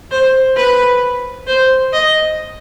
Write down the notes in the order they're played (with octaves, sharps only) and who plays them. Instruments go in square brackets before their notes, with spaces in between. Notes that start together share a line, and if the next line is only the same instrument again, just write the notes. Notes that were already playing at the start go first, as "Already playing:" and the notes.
[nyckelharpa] C5
B4
C5
D#5